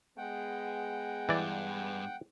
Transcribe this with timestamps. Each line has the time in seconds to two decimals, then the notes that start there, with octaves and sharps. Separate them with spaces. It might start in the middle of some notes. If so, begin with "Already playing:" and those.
0.18 G#3 B3 G#4 F#5 G5
1.29 G2 E3 D5